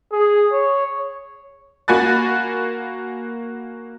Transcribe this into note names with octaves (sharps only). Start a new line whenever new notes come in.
G#4
C#5
A#3 F#4 G#5 B5 F#6 A6